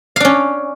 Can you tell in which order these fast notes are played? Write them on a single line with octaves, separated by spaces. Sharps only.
F5 D4 C#4